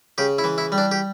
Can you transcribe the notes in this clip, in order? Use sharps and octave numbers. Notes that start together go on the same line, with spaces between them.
C#3 G4
E4
E3
E4
G3
D4
G4